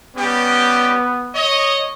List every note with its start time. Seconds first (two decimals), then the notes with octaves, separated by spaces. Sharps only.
0.17 G3 B3 C#4 G4
1.34 C#5 D#5